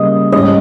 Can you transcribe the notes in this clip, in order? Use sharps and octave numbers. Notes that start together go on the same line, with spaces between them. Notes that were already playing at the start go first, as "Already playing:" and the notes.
Already playing: C#3 G3 A#3 D#5
G#2 G3 C#4 D#5